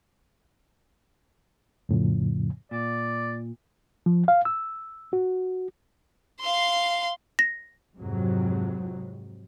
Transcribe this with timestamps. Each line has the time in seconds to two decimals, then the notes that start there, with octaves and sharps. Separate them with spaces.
1.89 F2 A2 C#3 F3
2.71 A#2 D5
4.06 F3
4.28 F5
4.45 E6
5.13 F#4
6.41 F5 C6
7.39 A#6
7.96 F2 G#2 C3 F#3